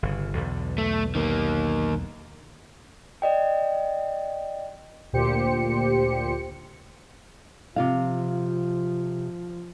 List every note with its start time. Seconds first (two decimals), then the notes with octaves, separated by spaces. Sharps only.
0.03 G1 C#3
0.35 B1 E2 D3
0.78 A3
1.15 D#3 A#3
3.22 D5 D#5 G5
5.13 D2 A#2 G4 C5 C#7
7.76 C3 F3 F4 F5